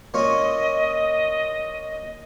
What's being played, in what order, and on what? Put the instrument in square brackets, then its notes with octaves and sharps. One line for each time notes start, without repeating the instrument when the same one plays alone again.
[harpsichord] A#2 C#4 F4 [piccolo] D#5